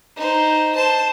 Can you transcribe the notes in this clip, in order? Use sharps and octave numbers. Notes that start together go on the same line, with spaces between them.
D#4 C5
C5 A5